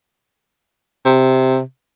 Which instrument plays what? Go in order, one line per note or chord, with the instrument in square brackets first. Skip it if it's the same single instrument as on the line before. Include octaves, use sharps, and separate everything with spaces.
[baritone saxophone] C3